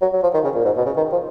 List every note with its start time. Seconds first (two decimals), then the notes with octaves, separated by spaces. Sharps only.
0.02 F#3
0.13 F#3
0.23 F3
0.34 D#3
0.44 C#3
0.55 A#2
0.65 G#2
0.77 B2
0.86 C#3
0.97 D#3
1.12 F3